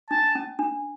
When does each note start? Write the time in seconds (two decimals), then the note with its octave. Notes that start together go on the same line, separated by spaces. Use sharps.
0.10 D4 A5
0.35 C#4
0.59 D4